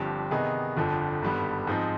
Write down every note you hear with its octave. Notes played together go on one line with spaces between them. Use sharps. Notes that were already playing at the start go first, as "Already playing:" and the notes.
Already playing: G1 G2 F3 C4 G4
C3 D#3 B3 D#4 G#4
G1 F2 D3 F3
G#1 G2 D3 G3 B3
G#2 F3 C4 D#4